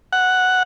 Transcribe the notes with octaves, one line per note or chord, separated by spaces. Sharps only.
F#5